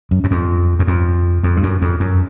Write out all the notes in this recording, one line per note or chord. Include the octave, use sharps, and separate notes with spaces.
F#2
F#2
F2
F#2
F2
F2
G2
F#2
F2
F#2